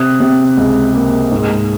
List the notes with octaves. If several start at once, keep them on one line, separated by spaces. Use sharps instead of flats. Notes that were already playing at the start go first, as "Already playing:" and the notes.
Already playing: C3 D#6 F#6
C3
C#2
A#3
G#2